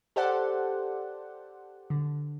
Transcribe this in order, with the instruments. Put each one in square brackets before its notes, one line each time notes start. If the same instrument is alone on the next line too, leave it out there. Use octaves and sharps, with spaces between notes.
[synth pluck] G4 A4 C5 D5 F#5
D3